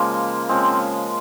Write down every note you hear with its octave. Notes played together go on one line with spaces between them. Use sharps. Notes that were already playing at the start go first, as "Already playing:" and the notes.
Already playing: C#3 F3 G#3 A#3
C#3 F3 G#3 C4